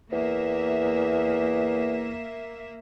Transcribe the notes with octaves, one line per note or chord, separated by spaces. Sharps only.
E2 A#3 E5